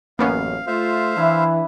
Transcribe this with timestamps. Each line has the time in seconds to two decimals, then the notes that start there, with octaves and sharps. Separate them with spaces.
0.19 A1 F#2 A#3 B3 C#4 F5
0.67 A3 F4 C5 E5 F5
1.16 E3 D4 E4 B4